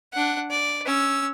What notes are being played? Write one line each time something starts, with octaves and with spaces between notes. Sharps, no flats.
D4 F#5
D5
C#4 E6